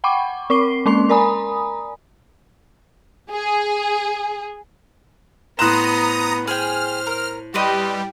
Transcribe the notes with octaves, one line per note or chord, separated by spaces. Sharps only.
F#5 G5 B5 C#6 D6
C4 A#4 C#6 D6 C7 G7
G#3 A#3 C#4 C6 C7 F7
A#4 D5 G#5 A#5 B5 D#6
G#4
A2 B3 C5 A#5 D#6 F#6 E7
G#4 C5 G5 F6
A#4
G3 C4 G4 B4 D#5